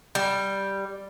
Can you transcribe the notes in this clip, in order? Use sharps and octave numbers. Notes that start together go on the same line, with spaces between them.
G3